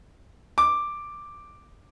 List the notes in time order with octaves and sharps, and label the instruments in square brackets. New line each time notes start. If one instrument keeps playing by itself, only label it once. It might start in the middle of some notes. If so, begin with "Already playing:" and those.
[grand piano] D6